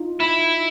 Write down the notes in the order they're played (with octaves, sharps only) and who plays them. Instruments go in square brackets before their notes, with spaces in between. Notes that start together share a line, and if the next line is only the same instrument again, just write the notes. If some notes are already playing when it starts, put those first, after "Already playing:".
Already playing: [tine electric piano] D#4 F4
[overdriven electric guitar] E4